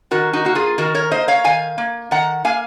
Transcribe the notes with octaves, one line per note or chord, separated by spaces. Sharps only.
D#3 F#4 A#4
D#4 F#4
A#3 F#4
F4 G#4
D#3 F#4 A#4
A#4 C#5
A#3 C5 D#5
C#5 F5
D#3 F5 G#5
A#3
D#3 F#5 A#5
A#3 F5 G#5